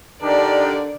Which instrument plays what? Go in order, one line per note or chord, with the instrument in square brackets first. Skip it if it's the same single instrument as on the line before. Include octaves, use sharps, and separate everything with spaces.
[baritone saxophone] D3 [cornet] D4 [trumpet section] D#4 G4 A#4 [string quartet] D5